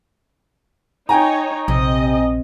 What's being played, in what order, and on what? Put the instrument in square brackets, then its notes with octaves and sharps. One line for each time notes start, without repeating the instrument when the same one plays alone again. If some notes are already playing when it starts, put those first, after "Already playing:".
[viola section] D#4 C#5 [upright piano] G5 G#5 A#5
[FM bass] A#1 [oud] C3 [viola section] D#5